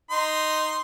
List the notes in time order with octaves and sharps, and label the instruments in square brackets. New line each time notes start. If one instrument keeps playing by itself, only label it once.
[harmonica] D#4 C6